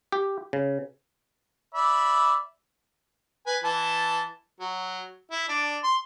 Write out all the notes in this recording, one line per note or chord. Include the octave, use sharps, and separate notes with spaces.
G4
C#3
D5 E5 B5
B4 G#5
E3 A5
F#3
E4
D4 D5
C6